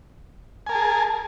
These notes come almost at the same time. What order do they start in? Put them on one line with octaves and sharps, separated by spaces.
G#5 A#4 A5 G#4